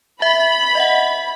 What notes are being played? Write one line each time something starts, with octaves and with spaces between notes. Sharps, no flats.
E5 B5
D#5 E5 F#5